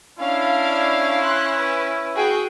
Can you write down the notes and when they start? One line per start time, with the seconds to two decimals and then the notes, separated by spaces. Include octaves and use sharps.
0.19 C#4 D4 E4 F5
1.24 C6 F#6
1.56 B4
2.15 F#4 G#4 G5